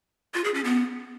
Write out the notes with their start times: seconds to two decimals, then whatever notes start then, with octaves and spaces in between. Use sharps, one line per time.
0.34 F4
0.44 G#4
0.54 C#4
0.64 B3